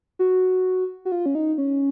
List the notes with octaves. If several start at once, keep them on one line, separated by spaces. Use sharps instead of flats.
F#4
F#4
F4
C#4
D#4
C#4